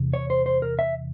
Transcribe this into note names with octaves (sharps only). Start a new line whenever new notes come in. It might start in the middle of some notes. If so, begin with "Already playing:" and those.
Already playing: E2 C3
C#5
C5
C5
A#4
E5